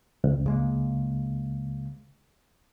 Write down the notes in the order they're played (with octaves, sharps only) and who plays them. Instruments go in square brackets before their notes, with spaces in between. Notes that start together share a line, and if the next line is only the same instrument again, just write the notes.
[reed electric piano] C#2
[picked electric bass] C#3 G#3 A#3